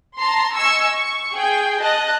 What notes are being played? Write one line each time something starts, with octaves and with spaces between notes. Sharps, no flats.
A5 A#5 C6
D#5 G#5 C#6 E6
C#6
G#4 G5
D#5 A5 F#6